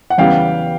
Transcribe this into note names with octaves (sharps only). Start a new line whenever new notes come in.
F#5
E2 C#3 E3 G3 B3 F5 G5